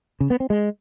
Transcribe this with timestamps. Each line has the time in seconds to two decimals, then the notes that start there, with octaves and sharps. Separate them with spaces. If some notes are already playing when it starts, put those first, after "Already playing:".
0.20 C#3
0.30 B3
0.40 C4
0.50 G#3